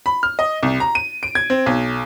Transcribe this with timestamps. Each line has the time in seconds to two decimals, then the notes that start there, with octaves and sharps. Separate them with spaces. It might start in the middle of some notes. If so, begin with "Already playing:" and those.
0.06 B5
0.23 F6
0.39 D#5
0.63 C2
0.80 A#5
0.95 D#7
1.23 D7
1.35 G#6
1.50 C4
1.66 B1